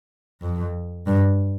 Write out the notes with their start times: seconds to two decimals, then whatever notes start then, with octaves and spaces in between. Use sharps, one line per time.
0.42 F2
1.07 G2